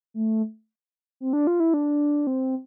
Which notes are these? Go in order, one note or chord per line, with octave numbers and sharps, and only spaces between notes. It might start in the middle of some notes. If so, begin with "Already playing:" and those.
A3
C4
D4
F4
E4
D4
C4